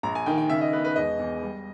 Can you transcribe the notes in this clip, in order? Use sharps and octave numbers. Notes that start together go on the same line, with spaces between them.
A#1 A#5
G#5
D#3 G5
G5
C#3 E5
D#5
B3 B4
B4
E1 D#5
E2
G3